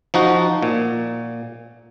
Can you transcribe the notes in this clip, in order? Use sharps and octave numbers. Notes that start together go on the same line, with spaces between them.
F3 D#4 F#4
A#2